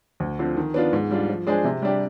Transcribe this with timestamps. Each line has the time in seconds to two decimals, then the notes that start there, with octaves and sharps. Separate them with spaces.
0.20 D2
0.39 D3 F3 C4
0.57 D#3
0.74 B3 D4 F4
0.93 G#2
1.11 G3 D4 F4
1.29 F3
1.47 G#3 D4 G#4 C5
1.64 C3
1.82 G3 D4 G4